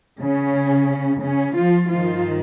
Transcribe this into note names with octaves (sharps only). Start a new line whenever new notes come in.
C#3 C#4
C#3 C#4
F3 F4
G2 D#3 F3 F4